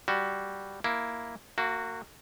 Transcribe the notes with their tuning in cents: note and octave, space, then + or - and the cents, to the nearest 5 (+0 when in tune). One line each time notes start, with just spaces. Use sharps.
G3 +0 F#4 +10
A#3 +0 E4 +0
A#3 -30 F#4 +0